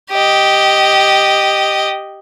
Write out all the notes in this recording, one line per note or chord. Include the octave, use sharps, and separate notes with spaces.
G4 D#5